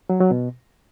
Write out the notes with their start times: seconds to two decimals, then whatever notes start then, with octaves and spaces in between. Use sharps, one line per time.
0.10 F#3
0.20 F#3
0.31 B2